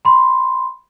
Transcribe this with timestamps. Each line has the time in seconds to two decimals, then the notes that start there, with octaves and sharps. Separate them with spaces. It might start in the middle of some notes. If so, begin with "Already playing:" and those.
0.05 B5 C6